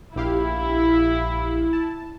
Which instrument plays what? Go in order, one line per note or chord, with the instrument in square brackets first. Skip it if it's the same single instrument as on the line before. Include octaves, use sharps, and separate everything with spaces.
[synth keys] A#1 G4 F5 [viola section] E4
[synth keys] A5